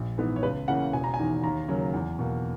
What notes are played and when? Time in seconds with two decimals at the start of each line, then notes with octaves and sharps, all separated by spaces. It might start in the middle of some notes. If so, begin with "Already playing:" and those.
Already playing: A#1
0.18 G#2 E3 B3
0.36 C#5
0.43 C#2 B4
0.68 C#3 E3 A#3 F#5
0.93 E1 G#5
1.04 A#5
1.14 G#5
1.19 E2 D#3
1.44 D#2 A#5
1.68 C#3 F#3 A#3
1.94 E2
2.19 B2 A#3